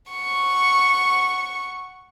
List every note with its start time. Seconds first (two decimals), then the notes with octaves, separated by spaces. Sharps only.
0.12 F#5 C#6